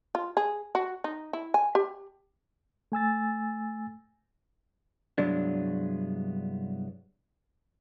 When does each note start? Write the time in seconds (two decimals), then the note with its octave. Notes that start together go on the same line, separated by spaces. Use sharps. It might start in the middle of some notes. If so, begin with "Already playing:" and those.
0.15 F4
0.37 G#4
0.75 F#4
1.04 D#4
1.33 E4
1.54 G#5
1.75 G4
2.92 A3 G#5 E6 A6
5.18 C2 G2 F#3 G#3 B3 D4